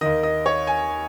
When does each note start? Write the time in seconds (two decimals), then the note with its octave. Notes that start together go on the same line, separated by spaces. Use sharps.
0.01 D#2 D#3 D#5
0.23 D#5
0.46 C#5
0.67 G#5